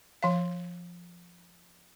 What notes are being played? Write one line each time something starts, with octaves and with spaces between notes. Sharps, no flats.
F3 F5